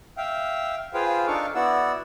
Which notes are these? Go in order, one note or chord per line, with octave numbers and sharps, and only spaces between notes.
E5 F5 G5
F4 G#4 B4 C5 F5 G5
D4 D#4 A4 F5 C#6 D6
B3 E4 F#4 D5 F#5 E6